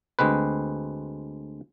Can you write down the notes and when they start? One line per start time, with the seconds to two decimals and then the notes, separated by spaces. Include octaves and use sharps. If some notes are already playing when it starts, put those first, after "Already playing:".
0.19 D2 G#3 C4 B4